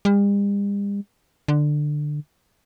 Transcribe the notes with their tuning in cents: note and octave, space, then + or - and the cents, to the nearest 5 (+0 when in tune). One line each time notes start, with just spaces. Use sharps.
G3 +45
D3 +15